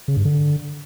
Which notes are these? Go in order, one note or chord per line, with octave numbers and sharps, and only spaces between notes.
C#3
G2
D3